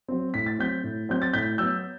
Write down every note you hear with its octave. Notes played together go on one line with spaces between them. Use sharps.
F#3 C4
A2 B6
A6
F#3 C4 G6 B6
A2
F#3 C4 G6
A6
A2 G6 B6
F#3 B3 E6 G6